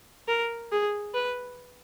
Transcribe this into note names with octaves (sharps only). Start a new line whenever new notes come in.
A#4
G#4
B4